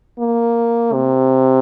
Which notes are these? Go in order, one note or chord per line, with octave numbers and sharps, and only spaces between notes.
A#3
C3